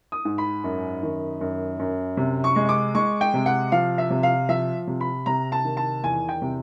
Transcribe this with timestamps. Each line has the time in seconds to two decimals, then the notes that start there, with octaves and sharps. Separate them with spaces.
0.12 D#6
0.25 G#2
0.38 B5
0.64 F#2
1.03 D#3
1.41 F#2
1.79 F#2
2.17 C3
2.44 C#6
2.56 G#3
2.69 D6
2.95 G#3 C#6
3.21 G5
3.34 C3
3.46 F#5
3.72 F3 F5
3.98 E5
4.10 C3
4.23 F5
4.49 F3 E5
4.87 C3
5.01 B5
5.26 C3 A#5
5.52 A5
5.64 D#3
5.77 A5
6.03 E2 G#5
6.29 G5
6.42 C3